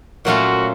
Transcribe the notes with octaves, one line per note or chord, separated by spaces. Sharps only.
A#2 F#3 A3 C#4 F4 F#4